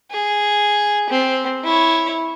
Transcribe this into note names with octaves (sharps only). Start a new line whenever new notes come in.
G#4
C4
E4 C#5